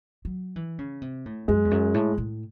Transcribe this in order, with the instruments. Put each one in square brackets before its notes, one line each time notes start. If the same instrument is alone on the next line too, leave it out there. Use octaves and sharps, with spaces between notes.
[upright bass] F#3
E3
C#3
C3
A2
[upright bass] F#2 [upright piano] G#3
[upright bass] E2
F#2
A2
A2